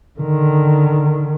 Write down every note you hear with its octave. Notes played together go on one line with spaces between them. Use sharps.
D3 D#3